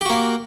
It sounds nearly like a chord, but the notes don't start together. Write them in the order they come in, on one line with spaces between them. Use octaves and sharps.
G4 F#4 A#3